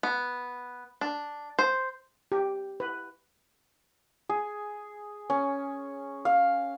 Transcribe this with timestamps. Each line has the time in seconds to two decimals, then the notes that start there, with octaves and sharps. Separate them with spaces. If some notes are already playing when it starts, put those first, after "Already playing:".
0.03 B3
1.01 D4
1.59 C5
2.32 G4
2.80 B4
4.29 G#4
5.30 C#4
6.25 F5